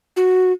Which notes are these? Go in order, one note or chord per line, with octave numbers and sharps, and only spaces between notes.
F#4